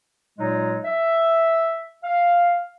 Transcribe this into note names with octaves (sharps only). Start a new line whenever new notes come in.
A#2 F#3 G#3 D#4
E5
F5